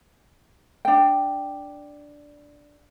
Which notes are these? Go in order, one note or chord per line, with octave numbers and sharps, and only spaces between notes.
D4 G5